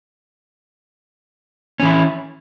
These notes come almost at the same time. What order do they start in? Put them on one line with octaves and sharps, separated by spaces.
C#4 E3 E4